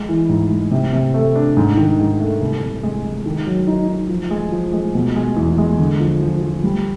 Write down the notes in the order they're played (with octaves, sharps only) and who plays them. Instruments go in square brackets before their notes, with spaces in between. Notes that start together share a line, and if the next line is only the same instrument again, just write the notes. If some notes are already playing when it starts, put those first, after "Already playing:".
Already playing: [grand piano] G#3
E3
G#2
G#3
C3
C3
A3
D4
G#2
D#3
G#2
A3
C2
C2
G#3
G#3
D#3
F#3
D#4
D#4
F3
G#3
F3
G#3
B2
G#3
E2
G#3
D3
F3
F3
F3
G3